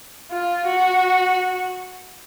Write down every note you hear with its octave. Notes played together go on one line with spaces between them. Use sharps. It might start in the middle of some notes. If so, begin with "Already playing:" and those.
F4
F#4